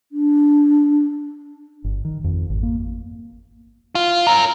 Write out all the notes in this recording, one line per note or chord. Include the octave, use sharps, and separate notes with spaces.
D4
G1
D#3
F2
G#1
A#3
F4
C#4 A#4